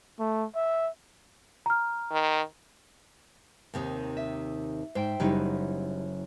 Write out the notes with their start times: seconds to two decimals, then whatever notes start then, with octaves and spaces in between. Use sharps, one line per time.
0.19 A3
0.55 E5
1.66 A#5 F6
2.11 D#3
3.74 D#2 C3 D#3
4.17 E5
4.95 G#2 C5 E5 G5
5.20 F#1 F#3 G3 D#4 E4